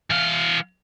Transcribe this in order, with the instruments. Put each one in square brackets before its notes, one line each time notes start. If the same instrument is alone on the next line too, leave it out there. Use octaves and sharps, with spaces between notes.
[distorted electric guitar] E3 F5